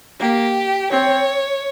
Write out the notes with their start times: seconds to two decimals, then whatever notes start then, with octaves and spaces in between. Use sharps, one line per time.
0.19 A#3 G4
0.90 C4 C#5